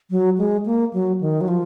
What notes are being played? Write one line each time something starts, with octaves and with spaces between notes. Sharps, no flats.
F#3
G#3
A#3
F#3
D#3
F#3
F3